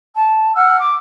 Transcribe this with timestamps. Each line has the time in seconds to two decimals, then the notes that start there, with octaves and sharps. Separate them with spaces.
0.14 A5
0.55 F#5 E6 F6
0.78 D6